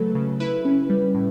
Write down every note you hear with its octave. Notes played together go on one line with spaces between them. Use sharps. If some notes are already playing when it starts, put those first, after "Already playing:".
Already playing: C#3 F#3 A3 A4 B4
C#3
E4 B4
C#4
G3
A2